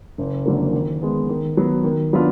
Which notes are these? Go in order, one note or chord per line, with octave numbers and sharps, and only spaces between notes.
F#1
F2 D3 F#3 A#3
D#3
G#3 B3
D#3
F#3 B3
D#3
F#3 B3 D4 F4